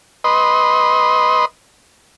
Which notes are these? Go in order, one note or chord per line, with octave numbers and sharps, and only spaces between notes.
B4 D#5 C6